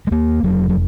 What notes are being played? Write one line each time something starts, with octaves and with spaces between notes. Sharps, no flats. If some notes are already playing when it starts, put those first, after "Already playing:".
G#3
D#2 A#3
F1 F#3
F#3